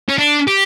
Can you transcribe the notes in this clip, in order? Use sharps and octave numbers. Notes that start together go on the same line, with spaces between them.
C#4
D4
G4